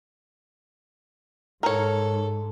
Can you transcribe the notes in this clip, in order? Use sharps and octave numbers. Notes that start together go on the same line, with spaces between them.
G#2 A4 A#4 C#5